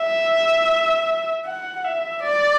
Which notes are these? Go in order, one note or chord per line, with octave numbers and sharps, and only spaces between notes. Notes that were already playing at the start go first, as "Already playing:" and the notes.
Already playing: E5
F#5
E5
D5